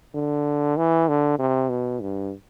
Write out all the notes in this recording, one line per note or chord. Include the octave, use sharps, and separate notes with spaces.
D3
E3
D3
C3
B2
G2